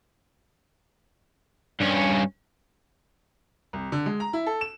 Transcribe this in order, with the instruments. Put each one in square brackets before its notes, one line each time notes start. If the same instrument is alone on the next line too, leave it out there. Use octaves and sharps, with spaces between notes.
[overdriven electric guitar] G2 C#4
[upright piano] C2
D3
G#3
A#5
E4
A4
E7